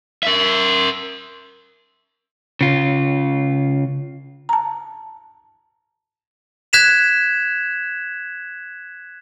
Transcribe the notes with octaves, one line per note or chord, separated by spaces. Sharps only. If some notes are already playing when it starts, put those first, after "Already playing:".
A#4 E5
C#3 F4
A5 A#5
F#6 G#6 B6 E7 F7